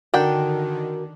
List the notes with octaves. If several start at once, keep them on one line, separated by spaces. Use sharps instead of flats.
D3 D#3 D4 F#4 A#4 F#5 G5